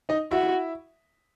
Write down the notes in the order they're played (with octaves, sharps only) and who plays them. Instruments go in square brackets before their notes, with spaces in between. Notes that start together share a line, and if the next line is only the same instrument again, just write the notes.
[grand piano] D#4 D#5
[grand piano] E4 E5 [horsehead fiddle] F#4